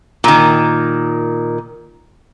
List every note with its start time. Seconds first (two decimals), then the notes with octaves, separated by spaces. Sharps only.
0.24 A#2 D#3